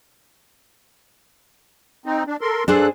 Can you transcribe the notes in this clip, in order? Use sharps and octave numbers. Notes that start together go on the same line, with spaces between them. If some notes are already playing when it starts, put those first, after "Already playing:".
C4 D#4
D4
A4 A#4 C6
G2 D4 G#4 A4 C5 F#6